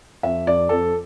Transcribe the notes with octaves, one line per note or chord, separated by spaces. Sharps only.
F2 E5
F2 D5
F2 A4